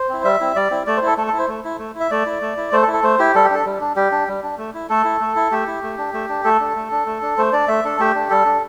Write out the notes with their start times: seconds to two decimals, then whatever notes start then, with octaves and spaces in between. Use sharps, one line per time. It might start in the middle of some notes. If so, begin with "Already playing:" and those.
Already playing: C5
0.09 C4 E4
0.24 G3 E5
0.40 C4 E4
0.56 G3 D5
0.70 C4 E4
0.87 A3 D5
0.97 C5
1.02 E4 A4
1.17 A3 A4
1.27 A4
1.34 E4
1.39 C5
1.48 A3
1.64 E4
1.79 A3
1.95 E4
2.00 E5
2.11 A3 D5
2.26 E4
2.41 A3
2.57 E4
2.72 A3 C5
2.82 A4
2.88 E4
2.93 A4
3.03 A3 C5
3.19 E4 G4
3.35 G3 A4
3.44 G4
3.50 D4 A4
3.66 G3
3.80 D4
3.96 G3 G4
4.12 D4
4.28 G3
4.43 D4
4.58 A3
4.74 E4
4.89 A3 A4
5.04 E4
5.21 A3
5.36 E4
5.51 A3 G4
5.67 E4
5.83 A3
5.98 D4
6.13 A3
6.29 D4
6.44 A3 A4
6.60 D4
6.76 A3
6.91 D4
7.06 A3
7.22 D4
7.38 A3 C5
7.53 D4 D5
7.68 A3 E5
7.84 D4 A4
7.99 A3 G4
8.15 D4
8.30 G3 A4
8.45 D4